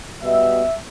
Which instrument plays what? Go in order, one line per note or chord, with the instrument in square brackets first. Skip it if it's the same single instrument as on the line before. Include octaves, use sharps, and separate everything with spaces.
[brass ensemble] B2 G3 B3 E5